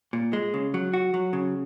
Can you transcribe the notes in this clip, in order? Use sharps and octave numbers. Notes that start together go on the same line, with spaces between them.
A#2
G#3
C#3
F#3
F#4
F#3
C#3